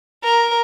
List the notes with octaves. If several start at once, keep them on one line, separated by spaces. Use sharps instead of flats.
A#4